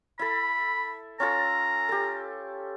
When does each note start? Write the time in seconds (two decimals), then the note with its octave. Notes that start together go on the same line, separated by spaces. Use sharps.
0.19 E4 A4 B5
1.20 C#4 F4 A4 A#5
1.89 G4 A4